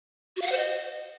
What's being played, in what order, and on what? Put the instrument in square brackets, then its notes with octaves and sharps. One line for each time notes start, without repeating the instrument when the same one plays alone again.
[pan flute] F#4
F5
F#5
C5
D#5